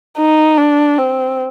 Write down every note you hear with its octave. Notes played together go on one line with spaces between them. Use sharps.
D#4
D4
C4